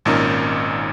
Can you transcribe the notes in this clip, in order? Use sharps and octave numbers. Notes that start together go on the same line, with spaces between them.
G#1 A#2 C#4 D#4 A#4